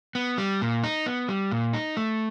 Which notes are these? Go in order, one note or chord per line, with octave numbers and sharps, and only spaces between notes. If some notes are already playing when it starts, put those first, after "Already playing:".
B3
G3
A#2
D#4
B3
G3
A#2
D#4
A3